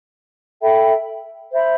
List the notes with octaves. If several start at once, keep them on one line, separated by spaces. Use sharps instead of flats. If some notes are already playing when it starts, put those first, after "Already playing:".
A4 E5 G5 B5
C5 E5 B5